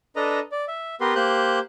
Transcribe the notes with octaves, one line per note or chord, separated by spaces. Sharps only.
D4 A4 B4 D#5 A#5
D5
E5
B3 G4 A#4 B4 C6
A#3 G4 C5 F#6 G6